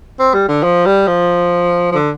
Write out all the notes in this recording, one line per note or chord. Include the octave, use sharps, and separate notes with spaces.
C4
G3
D3
F3
G3
F3
F3
D3